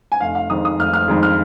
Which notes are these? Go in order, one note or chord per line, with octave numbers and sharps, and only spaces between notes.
G#5
F1 F5
F5
F2 D#3 G#3 D#6
D#6
F1 F6
F6
F2 D#3 G#3
F6